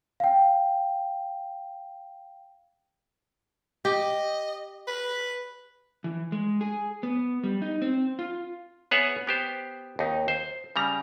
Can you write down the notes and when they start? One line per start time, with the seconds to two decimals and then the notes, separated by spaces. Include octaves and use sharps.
0.20 F5 G5
3.85 G4 D#5
4.87 B4
6.04 E3
6.32 G#3
6.61 G#4
7.03 B3
7.44 G3
7.62 D#4
7.82 C4
8.19 F4
8.91 B3 G#4 C#5 E5 F#5
9.27 B3 G4 C5
9.99 D#2 D#4
10.28 C5
10.76 C#3 G3 A#5